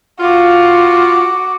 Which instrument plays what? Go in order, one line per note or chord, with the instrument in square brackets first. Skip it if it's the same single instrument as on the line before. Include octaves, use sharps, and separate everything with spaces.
[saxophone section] F4 [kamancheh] F#4 D6